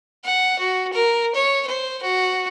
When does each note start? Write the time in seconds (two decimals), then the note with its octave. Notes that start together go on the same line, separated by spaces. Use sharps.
0.24 F#5
0.59 F#4
0.93 A#4
1.34 C#5
1.67 C5
2.02 F#4